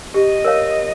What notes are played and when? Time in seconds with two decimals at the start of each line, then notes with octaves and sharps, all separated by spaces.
0.14 G4 D#5
0.44 A#4 C#5 F5